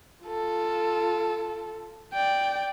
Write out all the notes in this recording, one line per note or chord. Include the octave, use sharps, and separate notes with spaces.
F4 A4
D5 G5